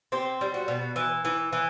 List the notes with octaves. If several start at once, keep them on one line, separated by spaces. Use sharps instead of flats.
C4 G4
G3
F#4
B2
E3
E3
E3